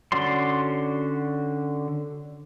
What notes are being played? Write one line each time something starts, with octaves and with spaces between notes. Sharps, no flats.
D3 C#4 F#4 D5 C6